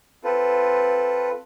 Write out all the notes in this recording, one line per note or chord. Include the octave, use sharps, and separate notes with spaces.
C4 F4 A4 B4